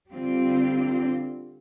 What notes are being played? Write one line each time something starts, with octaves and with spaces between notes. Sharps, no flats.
D3 G3 C4 F4